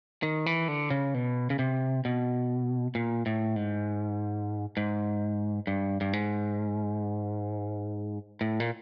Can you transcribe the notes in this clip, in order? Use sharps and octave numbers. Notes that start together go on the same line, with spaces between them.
D#3
E3
D3
C#3
B2
C#3
C3
B2
A#2
A2
G#2
G#2
G2
G2
G#2
A2
A#2